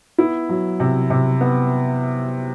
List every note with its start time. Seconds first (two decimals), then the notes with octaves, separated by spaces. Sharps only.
0.18 B3 E4
0.49 F#3
0.80 C3
1.10 C3
1.41 B3